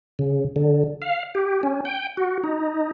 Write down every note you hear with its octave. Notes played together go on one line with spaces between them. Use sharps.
C#3
D3
F5
G4
C#4
G5
F#4
D#4